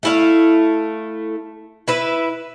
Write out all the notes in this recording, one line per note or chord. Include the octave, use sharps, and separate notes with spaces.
A3 E4 F5
E4 B4 E5